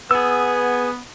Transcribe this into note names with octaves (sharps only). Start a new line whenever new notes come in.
B3 G#4 E6